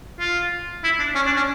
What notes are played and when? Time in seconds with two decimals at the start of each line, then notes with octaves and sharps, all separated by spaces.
0.20 F4
0.84 E4
0.99 D4
1.15 C#4
1.26 D4
1.37 C#4